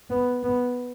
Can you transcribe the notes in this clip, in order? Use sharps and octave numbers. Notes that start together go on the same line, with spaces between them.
B3
B3